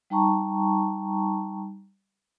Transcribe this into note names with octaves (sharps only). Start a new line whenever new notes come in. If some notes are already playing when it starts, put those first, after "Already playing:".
G3 D#4 G5 A5 A#5 C#6